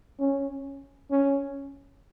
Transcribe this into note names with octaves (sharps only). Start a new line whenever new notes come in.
C#4
C#4